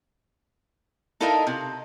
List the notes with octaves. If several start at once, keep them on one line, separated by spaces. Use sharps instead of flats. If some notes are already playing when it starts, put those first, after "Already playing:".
D#4 E4 A4 A#4 D#5 F5
C3